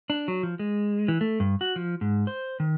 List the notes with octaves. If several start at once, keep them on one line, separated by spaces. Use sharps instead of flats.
D4
F#3
F3
G#3
E3
A3
G2
F#4
F3
G#2
C5
D#3